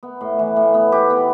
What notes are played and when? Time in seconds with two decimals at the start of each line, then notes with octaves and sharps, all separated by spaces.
0.03 B3
0.21 A2
0.39 E3
0.56 A2
0.74 B3
0.92 G4
1.10 B3